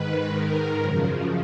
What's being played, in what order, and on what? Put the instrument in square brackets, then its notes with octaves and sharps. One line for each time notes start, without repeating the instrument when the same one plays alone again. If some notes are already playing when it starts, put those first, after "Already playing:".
Already playing: [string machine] G#2 D#3 B4
G#2 D#3 A#4
F#2 C#3 F3